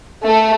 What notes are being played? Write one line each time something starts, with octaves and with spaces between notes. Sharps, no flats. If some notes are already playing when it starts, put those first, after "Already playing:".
A3